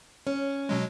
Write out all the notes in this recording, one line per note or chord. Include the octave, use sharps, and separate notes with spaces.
C#4
B2 F#3 G#3